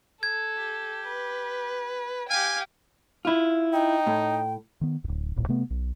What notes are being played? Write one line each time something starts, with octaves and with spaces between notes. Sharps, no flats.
A4 G#6
G4
B4
G4 F5 G5 G#5
E4 F4
D#4 G5
A2
D#3 B3
D1 C#2
D1 A1 A#2
C3 A3 B3
B1